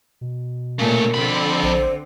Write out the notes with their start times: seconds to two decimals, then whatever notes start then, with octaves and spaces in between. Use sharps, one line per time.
0.21 B2
0.79 A#2 C#3 A3 A#4 C#5
1.15 F2 D3 C4 B5
1.63 A#1 C5